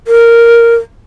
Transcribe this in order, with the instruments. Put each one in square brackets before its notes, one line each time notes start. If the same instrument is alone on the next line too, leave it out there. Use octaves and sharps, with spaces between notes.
[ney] A#4